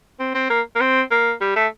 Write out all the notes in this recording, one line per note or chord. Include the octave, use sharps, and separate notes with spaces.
C4
C4
A#3
A#3
C4
A#3
G3
A3